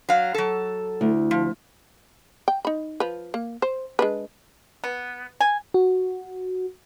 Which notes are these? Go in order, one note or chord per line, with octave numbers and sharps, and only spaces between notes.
F#3 F5
F#3 A4
D2 E4
F3
G5
D#4 B5
F3 B4
A#3
C5
G#3 D4 B4
B3
G#5
F#4